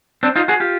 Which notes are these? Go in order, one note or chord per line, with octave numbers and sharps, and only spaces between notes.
C4 D4
D#4 F4
F#4 G#4
F4 G4